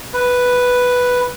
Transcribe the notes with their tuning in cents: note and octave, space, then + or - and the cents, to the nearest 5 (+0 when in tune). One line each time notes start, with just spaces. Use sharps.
B4 +0